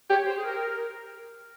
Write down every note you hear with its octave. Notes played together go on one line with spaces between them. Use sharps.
G4 C#5
C5
G#4
A#4